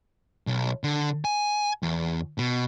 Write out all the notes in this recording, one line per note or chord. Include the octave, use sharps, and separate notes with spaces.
B1
D3
G#5
E2
B2